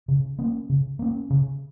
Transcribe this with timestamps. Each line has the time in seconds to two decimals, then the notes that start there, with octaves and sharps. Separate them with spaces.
0.08 C#3
0.39 A#3 C#4
0.70 C#3
0.99 A#3 C#4
1.30 C#3